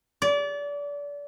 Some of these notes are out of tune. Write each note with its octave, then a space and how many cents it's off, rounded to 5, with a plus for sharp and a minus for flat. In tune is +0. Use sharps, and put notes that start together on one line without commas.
D5 -30